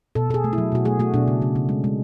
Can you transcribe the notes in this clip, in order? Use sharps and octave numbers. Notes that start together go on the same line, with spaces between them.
B2 A4
B2 G#4 A4
A3
E4
F#3
B2 F#4
A3 G#4
A3 F#4
B2 D4
C#3
C#3
C#3
G#3
G#3